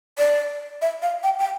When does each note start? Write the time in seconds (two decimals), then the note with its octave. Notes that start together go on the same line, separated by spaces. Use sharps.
0.18 D5
0.82 E5
1.02 F5
1.23 G5
1.39 G5